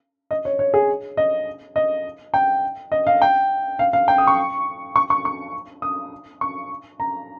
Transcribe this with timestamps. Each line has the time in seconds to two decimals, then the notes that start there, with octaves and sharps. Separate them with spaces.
0.31 D#5
0.45 C#5
0.59 C#5
0.74 G#4
1.17 D#5
1.76 D#5
2.34 G5
2.92 D#5
3.07 F5
3.22 G5
3.79 F5
3.93 F5
4.08 G5
4.18 D#6
4.27 C#6
4.96 C#6
5.10 C#6
5.25 C#6
5.82 D#6
6.41 C#6
7.00 A#5